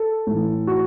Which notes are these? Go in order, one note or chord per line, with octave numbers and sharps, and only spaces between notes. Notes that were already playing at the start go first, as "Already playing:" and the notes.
Already playing: A4
A2 E3
F#4